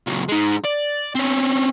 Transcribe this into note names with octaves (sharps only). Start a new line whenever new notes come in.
C#2 F#3
G#3 D#4
D5
C4 C#4